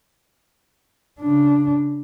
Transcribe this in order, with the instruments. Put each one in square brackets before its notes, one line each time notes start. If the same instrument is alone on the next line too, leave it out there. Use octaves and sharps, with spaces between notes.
[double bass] C#3 D4